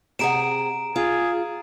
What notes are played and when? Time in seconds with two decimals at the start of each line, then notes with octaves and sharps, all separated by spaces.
0.19 C3 G#4 F#5 A#5 D7 E7
0.96 F4 G#4